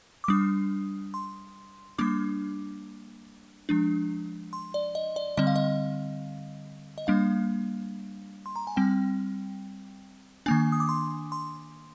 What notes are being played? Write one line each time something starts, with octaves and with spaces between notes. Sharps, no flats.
D6
G3 D4 D#6
C6
G3 A#3 D4 D6
F3 G#3 D4
C6
D5
D#5
D5
D3 G3 C4 D#5
F5
D#5
D#5
G3 A#3 D4 F5
C6
A#5
G#5
G3 C4 G5
D#3 A#3 D4 G#5
D#6
D6
C6
C6